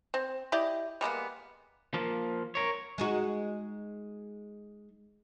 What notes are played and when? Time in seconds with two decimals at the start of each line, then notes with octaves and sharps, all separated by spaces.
0.14 C4
0.52 E4 G4 D5 D#5
1.01 G3 G#3 A#3 B3
1.94 F3 A#3
2.55 A#4 C#5
2.98 G#3 D#4 F#4